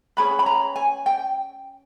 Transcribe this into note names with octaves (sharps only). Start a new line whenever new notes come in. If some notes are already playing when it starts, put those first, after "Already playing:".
C#4 G#4 B4 B5
B5
A#5
G#5
G5